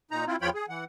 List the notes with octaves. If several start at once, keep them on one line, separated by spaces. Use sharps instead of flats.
A#2 D#4 A#5
C4 E4 F4
E2 F3 F4 C#5 G5 B5
G#4
E3 F#5